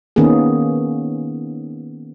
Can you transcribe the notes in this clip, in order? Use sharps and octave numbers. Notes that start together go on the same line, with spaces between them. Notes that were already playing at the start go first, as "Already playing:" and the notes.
D#3 A#3 B3 C#4 G#4